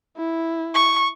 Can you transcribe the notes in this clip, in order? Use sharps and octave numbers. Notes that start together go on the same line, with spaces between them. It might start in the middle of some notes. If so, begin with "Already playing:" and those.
E4
C#6